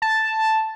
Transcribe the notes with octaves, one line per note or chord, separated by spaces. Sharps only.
A5